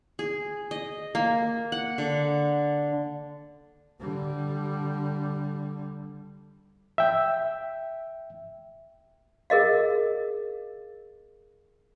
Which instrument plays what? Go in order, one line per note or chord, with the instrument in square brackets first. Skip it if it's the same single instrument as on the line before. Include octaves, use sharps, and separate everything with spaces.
[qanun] G#4
D#5
A#3
F#5
D3
[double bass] D3 G3
[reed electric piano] E5 G5
[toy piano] G#4 A#4 D#5 F5